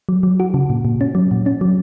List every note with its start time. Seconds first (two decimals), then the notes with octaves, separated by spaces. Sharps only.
0.09 F#3
0.23 F#3
0.40 F#4
0.54 C#3
0.70 A#2
0.85 A#2
1.01 C#4
1.15 F#3
1.31 A#2
1.46 C#4
1.61 F#3